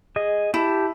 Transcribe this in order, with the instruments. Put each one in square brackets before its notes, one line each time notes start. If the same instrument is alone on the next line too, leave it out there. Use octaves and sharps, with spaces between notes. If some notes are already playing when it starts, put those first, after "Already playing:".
[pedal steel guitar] G#4 D#5
[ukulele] E4 [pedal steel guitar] G4 A5